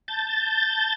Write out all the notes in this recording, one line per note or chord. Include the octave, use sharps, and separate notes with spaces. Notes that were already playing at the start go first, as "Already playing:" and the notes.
A5 G6 A6